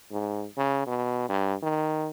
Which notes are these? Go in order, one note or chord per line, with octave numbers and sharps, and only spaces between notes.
G#2
C#3
B2
G2
D#3